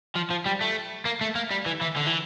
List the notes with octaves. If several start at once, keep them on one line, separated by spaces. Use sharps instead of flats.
F3
F3
G3
A3
A#3
A3
A#3
G3
E3
E3
D3
E3